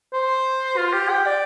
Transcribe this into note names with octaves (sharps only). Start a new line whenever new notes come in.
C5
F4
G4
G5
D5